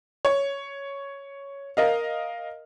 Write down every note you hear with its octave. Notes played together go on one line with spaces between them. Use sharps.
C#5
A#4 D#5 F5